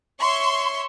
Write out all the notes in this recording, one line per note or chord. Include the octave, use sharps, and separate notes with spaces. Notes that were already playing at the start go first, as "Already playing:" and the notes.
C#5 E5 C6 C#6